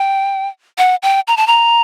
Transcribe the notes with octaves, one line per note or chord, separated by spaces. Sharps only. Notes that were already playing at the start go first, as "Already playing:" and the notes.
Already playing: G5
F#5
G5
A#5
A5
A#5